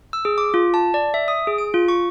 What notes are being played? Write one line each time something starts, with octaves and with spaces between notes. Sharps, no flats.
E6
G#4
D6
F4
A5
D5
E5
D#6
G#4
D7
F4
C#6